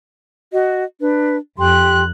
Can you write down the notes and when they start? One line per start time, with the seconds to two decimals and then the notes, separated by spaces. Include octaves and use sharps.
0.53 F#4 D#5
1.00 D4 B4
1.58 F2 G4 G5 C6 F#6